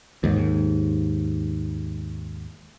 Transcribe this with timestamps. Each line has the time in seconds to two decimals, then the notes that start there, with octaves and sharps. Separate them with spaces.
0.24 D#2 G#2